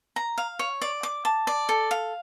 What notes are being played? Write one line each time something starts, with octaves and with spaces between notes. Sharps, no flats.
A#5
F5
C#5
D5
D6
A5
D5
A4
F5